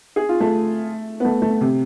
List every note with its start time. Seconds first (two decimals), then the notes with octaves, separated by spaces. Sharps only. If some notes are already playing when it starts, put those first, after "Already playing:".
0.16 G#4
0.29 F4
0.40 A3
1.20 B3
1.25 A3
1.42 A3
1.61 C3